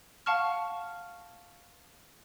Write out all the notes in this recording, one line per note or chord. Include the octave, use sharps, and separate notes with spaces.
F5 F#5 A5 C#6 F6